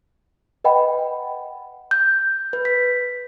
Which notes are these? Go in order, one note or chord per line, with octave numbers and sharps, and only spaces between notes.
B4 D#5 F#5 G5 B5
G6
B4
B6